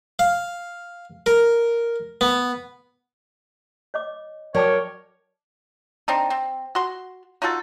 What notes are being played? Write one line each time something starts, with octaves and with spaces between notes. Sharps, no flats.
F5
A#4
B3
C#5 D#5 D6
F#3 A#4 C#5 D5 G5 A5 D6
C4 D4 D#4
C4
F#4 C6
D#4 F4 F#4 A4